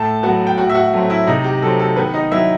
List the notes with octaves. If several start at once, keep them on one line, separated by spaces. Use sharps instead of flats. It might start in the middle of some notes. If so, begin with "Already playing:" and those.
Already playing: A2 A4 A5
F#3 B3 F#4 F#5
G5
A2 F#4 F#5
E5
F#4 F#5
F#3 A3 C4
E4 E5
C3 D#4 D#5
G4
F#3 C4 A4
A4
D#3 B3 B4
D#4 D#5
F#3 B3 E4 E5